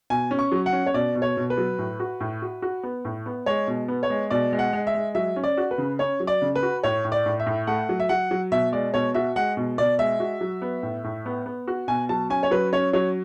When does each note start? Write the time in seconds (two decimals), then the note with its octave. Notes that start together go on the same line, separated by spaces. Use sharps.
0.10 B2 G#5
0.31 C#4
0.39 C#6
0.52 F#3
0.66 F#5
0.73 C#4
0.86 C#5
0.94 B2 D5
1.15 B2
1.22 C#5
1.37 B2
1.50 B4
1.58 F#3
1.79 A2
2.00 F#4
2.20 A2
2.42 F#4
2.62 F#4
2.83 B3
3.05 A2
3.26 B3
3.46 G#3 C#5
3.67 B2
3.88 B3
4.03 C#5
4.10 G#3
4.30 B2 D5
4.52 G#3
4.59 F#5
4.73 G#3
4.87 E5
4.95 G#3
5.15 F#3 E5
5.36 C#4
5.44 D5
5.57 F#4
5.71 B4
5.78 C#3
5.99 C#4 C#5
6.20 F#3
6.27 D5
6.42 C#3
6.56 B4
6.63 F#4
6.83 A2 C#5
7.05 A2
7.12 D5
7.26 A2
7.40 E5
7.46 A2
7.67 A3 F#5
7.89 F#3
8.00 E5
8.09 F#3 F#5
8.31 F#3
8.52 B2 E5
8.72 G#3 D5
8.94 B2 C#5
9.14 F#4 E5
9.36 G#3 F#5
9.57 B2
9.78 B2 D5
9.99 G#3 E5
10.20 F#4
10.41 F#3
10.62 B3
10.83 A2
11.04 A2
11.26 B3
11.46 B3
11.68 F#4
11.88 B2 G#5
12.09 F#3 A5
12.30 C#4 G#5
12.43 C#5
12.51 F#3 B4
12.73 C#4 C#5
12.93 F#3 C#5